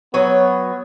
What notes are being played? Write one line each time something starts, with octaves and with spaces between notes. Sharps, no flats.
F#3 B3 C#5